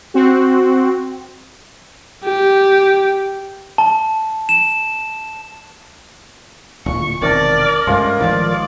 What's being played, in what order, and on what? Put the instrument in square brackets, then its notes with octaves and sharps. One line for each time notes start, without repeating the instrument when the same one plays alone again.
[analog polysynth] C4 F#4
[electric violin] G4
[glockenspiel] A5
E7
[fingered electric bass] D1 A#2 [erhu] C#6
[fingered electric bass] E1 C3 D#3 [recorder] A#4 [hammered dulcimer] C#5 A5 [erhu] D5
[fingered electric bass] G2 C#3 A3 [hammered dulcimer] F3 G#3 F4
[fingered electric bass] A1 D#3 F3 [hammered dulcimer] F4 [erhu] D5